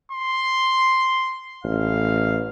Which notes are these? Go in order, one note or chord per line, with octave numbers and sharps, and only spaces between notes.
C6
A1 F5